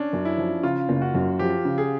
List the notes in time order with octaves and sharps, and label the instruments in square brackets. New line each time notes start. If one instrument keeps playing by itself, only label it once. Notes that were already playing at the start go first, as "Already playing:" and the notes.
Already playing: [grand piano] C#4 D4
[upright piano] F#2
[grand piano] E4
[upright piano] F3
[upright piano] C#3 [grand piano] F4
[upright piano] F#1
[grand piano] F#4
[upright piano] F#2
[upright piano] F3 [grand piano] G4
[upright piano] C#3
[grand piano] G#4